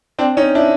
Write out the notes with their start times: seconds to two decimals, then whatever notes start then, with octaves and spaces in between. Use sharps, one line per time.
0.19 C4 D4
0.37 C#4 D#4
0.55 D4 E4